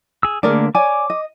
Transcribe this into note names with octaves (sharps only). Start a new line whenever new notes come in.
G#4 E6
D3 A3 A#3 G#4 A#4 D5
C#5 D5 G#5 D6
D#5